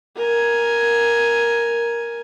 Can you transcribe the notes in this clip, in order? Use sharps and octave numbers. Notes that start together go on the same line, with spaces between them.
A#4 G#5